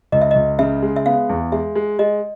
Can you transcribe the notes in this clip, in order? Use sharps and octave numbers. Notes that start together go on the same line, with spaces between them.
C#2 D#5
E5
C#2 D#5
C#3 E5
G#3
E5
B3 F5
E2
G#3 E5
G#3
G#3 D#5